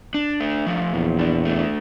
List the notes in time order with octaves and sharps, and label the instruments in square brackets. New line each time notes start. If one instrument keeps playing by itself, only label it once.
[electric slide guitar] D4
A3
F3
[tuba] E2 [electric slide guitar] A#2
[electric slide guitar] D4
A3